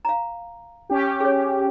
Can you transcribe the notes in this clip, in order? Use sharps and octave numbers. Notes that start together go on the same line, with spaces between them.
F5 A#5
C#4 G4
G#4 C#5